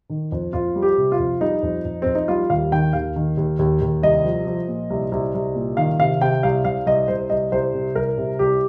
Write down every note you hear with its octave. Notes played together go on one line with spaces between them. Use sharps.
D#3
F2
F2 F4
G3
G4
C3
F4
F2
G3 D#4
F2
F2
F2 C4
D#4
G3 F4
D#2 F5
D#3 G5
D#2 F5
D#3
D#2
D#2
D#2
C2 D#5
F3
F3
A#2
C2
C2
C2
A#2
D#3 F5
C3 F5
C3 G5
C2 F5
C2 F5
C2 D#5
C2 C5
C2 D#5
C2 C5
C3
C2 A#4
C3
C2 G4